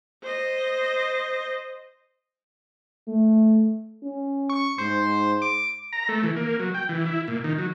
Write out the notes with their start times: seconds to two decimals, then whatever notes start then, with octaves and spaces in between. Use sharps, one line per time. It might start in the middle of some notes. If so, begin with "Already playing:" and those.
0.23 C5 D#5
3.08 A3
4.03 C#4
4.49 C#6
4.78 G#2 C5
5.42 D6
5.93 A#5
6.08 A3
6.23 E3
6.36 A#3
6.60 F#3
6.74 G5
6.89 E3
7.06 E4
7.28 A#2
7.44 D#3
7.58 F#3